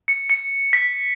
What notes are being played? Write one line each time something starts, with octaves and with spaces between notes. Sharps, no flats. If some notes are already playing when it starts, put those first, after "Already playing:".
C#7
C#7
B6